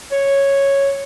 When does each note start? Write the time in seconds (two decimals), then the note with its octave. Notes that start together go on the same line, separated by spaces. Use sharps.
0.12 C#5